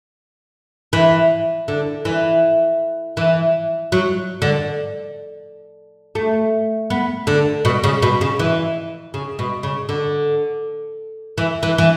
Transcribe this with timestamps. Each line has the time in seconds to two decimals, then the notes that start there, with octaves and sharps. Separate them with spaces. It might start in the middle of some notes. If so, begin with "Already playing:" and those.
0.93 E3
1.68 D3
2.05 E3
3.17 E3
3.92 F#3
4.42 D3
6.15 A3
6.90 B3
7.27 D3
7.65 B2
7.84 C#3
8.02 B2
8.21 C#3
8.39 E3
9.14 C#3
9.39 B2
9.63 C#3
9.89 D3
11.38 E3
11.63 E3
11.78 E3